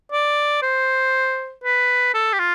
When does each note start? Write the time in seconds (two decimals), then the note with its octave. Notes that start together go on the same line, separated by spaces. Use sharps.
0.12 D5
0.62 C5
1.64 B4
2.14 A4
2.33 G4
2.39 F4